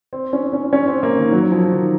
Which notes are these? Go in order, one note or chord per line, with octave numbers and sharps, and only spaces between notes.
C4
C#4
C#4
C#4
C4
A#3
D#3
F#3
F3
D#3